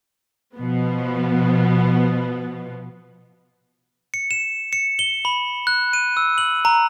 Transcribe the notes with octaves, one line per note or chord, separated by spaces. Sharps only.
B2 F3 B3
C#7
E7
C#7
G7
B5
F#6
D#7
E6
F#7
A#5